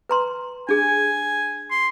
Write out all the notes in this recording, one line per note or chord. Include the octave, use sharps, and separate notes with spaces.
B4 A#5 C6
D4 G#4 G#5
C6